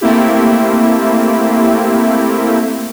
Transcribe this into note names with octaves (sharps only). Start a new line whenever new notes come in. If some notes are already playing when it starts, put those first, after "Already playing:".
A3 A#3 C4 E4 G4